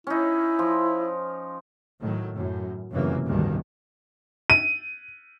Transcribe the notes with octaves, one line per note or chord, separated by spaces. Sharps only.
C#4 D#4 E4
F3
A2 D#3 F#3
F#2 A2
F1 F#2 C#3 E3 A#3
A1 D2 G2 B2 D#3
D#7